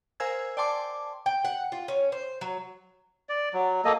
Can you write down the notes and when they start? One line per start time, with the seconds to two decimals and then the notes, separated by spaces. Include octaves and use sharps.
0.20 A#4 C5 F5 G#5 E6 G#6
0.57 D5 G5 A5 C6 D6
1.26 G5
1.45 F#5
1.72 F4
1.88 C#4
2.12 C5
2.41 F#3
3.29 D5
3.54 F#3
3.85 A#3 A4 D#5